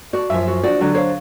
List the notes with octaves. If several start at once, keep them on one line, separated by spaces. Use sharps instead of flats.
F#4 D5 A5
F#2 F3 E5
F#4
F3 D4 F#4 D5
D3 F#3 D4
C5 C#5 F5